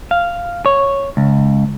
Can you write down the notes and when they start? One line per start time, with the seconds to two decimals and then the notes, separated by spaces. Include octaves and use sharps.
0.11 F5
0.66 C#5
1.17 C#2